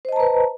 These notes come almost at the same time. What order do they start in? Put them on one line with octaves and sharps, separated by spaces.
C5 D#5 A5 A#5 B4